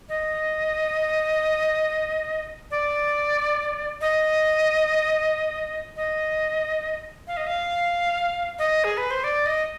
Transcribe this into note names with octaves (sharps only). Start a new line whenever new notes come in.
D#5
D5
D#5
D#5
F5
D#5
F5
D#5
G#4
B4
C5
D5
D#5